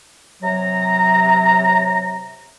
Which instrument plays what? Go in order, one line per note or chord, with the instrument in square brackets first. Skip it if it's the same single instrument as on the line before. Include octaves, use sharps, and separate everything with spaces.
[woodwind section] C3 F#3 A#5